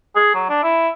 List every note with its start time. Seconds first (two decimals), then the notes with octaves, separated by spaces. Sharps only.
0.16 G#4
0.34 F#3
0.49 D4
0.64 E4